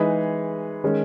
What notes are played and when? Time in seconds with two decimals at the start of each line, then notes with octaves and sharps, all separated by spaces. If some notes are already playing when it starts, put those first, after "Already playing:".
Already playing: E3 G#3 D#4 G#4 B4
0.84 D#3 G#3 C#4